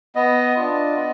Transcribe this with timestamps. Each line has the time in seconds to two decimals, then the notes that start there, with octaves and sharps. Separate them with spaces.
0.15 B3 D#5
0.56 D4 F4
0.95 B3